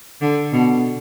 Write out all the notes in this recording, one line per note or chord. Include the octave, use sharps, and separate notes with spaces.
D3
B2